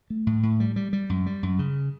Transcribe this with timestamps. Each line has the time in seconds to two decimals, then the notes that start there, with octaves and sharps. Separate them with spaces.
0.10 A3
0.27 A2
0.43 A2
0.60 G3
0.76 G3
0.93 G3
1.10 F#2
1.26 G3
1.43 F#2
1.59 C#3